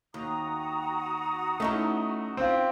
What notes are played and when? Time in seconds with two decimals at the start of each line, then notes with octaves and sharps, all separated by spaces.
0.14 D#2 F#4 A#5 D#6
1.60 A3 C#4 D#4 E4
2.37 C4 F4 G4